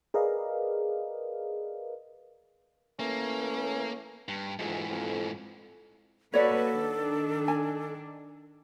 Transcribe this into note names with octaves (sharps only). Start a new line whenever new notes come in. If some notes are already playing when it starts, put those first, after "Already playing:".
G#4 A#4 B4 D5 D#5 F5
E3 A3 A#3 C#4
G2
D2 G#2 E3 F3 G#3
F2
A#3 F#4 A4 B4 C#5 D5
D#3 D4
G#5